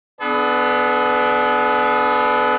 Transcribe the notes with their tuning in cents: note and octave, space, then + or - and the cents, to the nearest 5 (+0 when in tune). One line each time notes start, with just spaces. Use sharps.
B3 +15 D4 +5 A4 -45